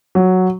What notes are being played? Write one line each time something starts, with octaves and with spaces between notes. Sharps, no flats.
F#3